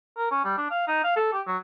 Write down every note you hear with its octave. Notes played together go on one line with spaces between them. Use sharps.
A#4
C#4
G3
D4
F5
D#4
F5
A4
G4
F#3